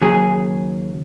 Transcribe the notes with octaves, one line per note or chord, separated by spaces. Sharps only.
D#2 C#3 F#3 G#4